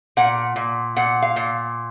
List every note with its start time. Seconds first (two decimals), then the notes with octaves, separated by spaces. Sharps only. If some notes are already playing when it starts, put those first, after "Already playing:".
0.17 A#2 F#5
0.56 A#2
0.96 A#2 F#5
1.22 F5
1.36 A#2